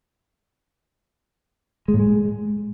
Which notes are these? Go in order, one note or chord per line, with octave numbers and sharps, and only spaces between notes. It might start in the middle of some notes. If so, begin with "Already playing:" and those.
G#3
A2
G#3